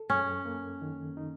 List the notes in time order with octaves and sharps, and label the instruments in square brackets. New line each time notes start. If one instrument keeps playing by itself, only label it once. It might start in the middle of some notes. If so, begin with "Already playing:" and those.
Already playing: [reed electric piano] A4
[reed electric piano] F#2 [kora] C#4
[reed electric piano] A#3
D#3
D#4